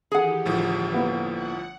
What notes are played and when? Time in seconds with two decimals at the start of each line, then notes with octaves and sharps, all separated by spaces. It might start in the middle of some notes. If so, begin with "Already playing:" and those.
0.12 D#3 E3 G4 G#4 F#5
0.45 G1 A2 F3
0.93 A#3 B3 E4
1.33 F#5